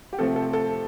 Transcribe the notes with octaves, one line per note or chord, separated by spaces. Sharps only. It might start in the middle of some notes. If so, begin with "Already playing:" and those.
G4
C3 F3 A3 C4 A4
A4
A4